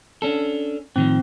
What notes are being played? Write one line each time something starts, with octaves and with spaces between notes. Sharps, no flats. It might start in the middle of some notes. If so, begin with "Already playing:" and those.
C#4 D4 A4
A2 D#3 F3 C4